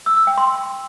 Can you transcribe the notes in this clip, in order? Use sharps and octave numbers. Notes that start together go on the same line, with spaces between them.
E6
E6
G5
C6